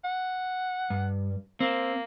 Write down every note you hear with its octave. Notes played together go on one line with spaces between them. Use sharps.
F#5
G2
A#3 C4